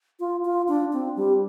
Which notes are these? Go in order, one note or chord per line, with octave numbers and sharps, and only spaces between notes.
F4
F4
D4
C4
G3